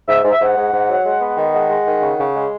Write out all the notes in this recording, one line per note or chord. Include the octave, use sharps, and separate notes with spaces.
G#2 E5
G#2
E5
G#2 F#5
G#2
G#2
F#3
G#3
B3
D#3
G#3 F#5
G#3
D#3
C#3
C#3
G#3